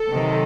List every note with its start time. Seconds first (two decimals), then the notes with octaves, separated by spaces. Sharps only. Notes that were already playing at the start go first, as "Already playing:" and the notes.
Already playing: A4
0.10 C3 D#3 F#3